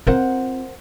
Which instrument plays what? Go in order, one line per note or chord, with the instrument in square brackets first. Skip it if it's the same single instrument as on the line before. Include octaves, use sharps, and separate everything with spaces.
[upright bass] C4 F4 [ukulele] A#4 C5 F#5